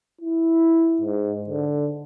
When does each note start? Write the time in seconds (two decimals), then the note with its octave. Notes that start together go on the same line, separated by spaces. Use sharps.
0.21 E4
1.02 G#2
1.50 D3